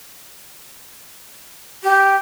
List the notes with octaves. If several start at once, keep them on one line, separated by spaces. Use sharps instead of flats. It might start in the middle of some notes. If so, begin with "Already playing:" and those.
G4